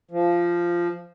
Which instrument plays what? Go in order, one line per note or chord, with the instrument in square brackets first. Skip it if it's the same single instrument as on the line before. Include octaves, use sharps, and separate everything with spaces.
[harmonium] F3